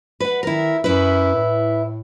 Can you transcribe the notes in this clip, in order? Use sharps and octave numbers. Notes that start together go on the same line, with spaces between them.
B4 F#5
D#3 E4 A#4
F#2 E4 B4
A2